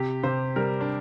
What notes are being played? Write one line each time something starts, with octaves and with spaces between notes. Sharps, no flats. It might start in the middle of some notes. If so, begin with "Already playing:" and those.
Already playing: C3 G4
C3 C5
G3 A#4
D4